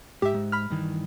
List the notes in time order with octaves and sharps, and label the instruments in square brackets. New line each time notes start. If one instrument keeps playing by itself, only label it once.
[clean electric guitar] G#2 [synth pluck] G4 E5
[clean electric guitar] G#2
[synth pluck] B5 F6
[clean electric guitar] G2 D#3 E3